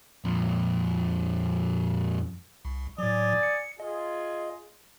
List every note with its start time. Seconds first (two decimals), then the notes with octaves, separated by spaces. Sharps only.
0.24 F2 A#2
2.65 C2
2.98 A2 F#3 D5 G#5 D#6
3.43 C#7
3.80 F4 G#4 D#5